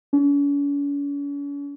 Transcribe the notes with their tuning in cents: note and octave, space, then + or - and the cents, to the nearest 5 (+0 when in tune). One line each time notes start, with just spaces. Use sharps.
C#4 +45